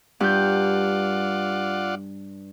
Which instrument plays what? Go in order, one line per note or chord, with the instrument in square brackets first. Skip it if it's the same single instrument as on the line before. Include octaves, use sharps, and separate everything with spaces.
[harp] G2 G6 [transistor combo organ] F4 D5 F#5